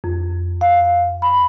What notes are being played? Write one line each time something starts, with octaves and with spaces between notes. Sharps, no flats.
F2
F5
B5